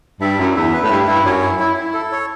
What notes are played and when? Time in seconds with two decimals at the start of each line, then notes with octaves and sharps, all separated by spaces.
0.21 G2 E5
0.39 F#2 E4
0.56 E2 E5
0.73 B4
0.83 A2
0.90 G2 E4
1.07 G2 E4
1.25 F#2 C#5
1.42 E4
1.59 E4
1.77 E4
1.94 A4
2.12 C#5